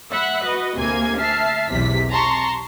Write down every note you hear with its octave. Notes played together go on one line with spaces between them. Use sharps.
E5 F#5 B5 F#6
F#4 B4 D#5
D2 C3 A#3 G#5 G#6
E5 A5 F6 C7
B1 E2 C3 B6
A5 A#5 C6 C#6